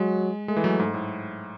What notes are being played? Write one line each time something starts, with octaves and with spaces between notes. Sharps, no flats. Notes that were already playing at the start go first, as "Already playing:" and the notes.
Already playing: F#3 G#3
G#3 A3
E3
F#3
G#2
A2